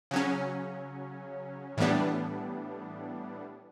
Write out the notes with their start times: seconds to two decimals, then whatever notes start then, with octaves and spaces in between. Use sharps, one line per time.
0.11 C#3 F#3 C#4
1.77 A2 E3 G3 B3 D4